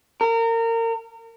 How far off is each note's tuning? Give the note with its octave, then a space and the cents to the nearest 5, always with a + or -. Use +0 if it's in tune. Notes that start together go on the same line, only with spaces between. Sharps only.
A#4 -30